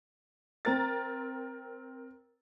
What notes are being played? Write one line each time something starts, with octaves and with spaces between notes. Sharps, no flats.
C4 A#4 A6